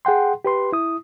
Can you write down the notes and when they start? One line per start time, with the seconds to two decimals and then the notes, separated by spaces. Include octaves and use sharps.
0.05 G#4 F#5 G5 C6
0.45 G4 B4 C6
0.72 E4 D#6